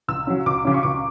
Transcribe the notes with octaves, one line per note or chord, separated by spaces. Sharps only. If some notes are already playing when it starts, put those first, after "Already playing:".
C#2 E6
C#3 F#3 C#4
C#2 D6
C#3 F#3 C#4
C#6
C#2 D6